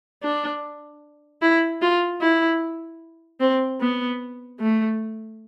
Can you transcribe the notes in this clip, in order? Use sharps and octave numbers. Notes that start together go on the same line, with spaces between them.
D4
E4
F4
E4
C4
B3
A3